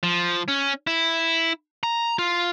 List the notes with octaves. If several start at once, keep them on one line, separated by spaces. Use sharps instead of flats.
F3
C#4
E4
A#5
F4